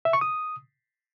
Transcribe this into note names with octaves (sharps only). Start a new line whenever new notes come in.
E5
C#6
D#6